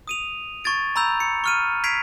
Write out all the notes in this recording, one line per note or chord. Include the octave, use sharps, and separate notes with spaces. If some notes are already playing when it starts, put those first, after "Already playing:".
D#6 D#7 F7
C#6 G#6 A6 D7
A#5 B5 E6 G6 F7
C#7
C#6 F6 D#7
G#6 B6 C7 D7 F7